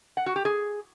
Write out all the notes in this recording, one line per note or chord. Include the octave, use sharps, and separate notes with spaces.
F#5
F#4
G4
G#4